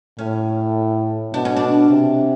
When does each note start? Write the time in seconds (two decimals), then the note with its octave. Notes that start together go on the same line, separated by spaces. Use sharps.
0.19 A2 C#4
1.34 B2 D4
1.45 C#4
1.57 D4
1.91 C3